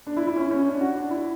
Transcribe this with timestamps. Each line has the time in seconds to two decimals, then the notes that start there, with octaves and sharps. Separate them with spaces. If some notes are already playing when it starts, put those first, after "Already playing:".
0.07 D4
0.17 E4
0.27 E4
0.36 C#4
0.51 C#4
0.66 D4
0.81 F#4
0.96 D4
1.11 E4